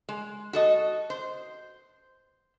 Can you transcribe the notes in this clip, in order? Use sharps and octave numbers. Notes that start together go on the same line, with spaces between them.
G#3
F#4 A4 D#5
C5